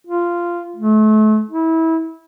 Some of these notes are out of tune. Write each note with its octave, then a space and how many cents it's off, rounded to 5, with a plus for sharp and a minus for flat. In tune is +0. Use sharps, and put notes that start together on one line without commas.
F4 -10
A3 -35
E4 -25